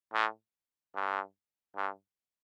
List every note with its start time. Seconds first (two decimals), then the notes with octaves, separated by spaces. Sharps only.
0.14 A2
0.95 G2
1.76 G2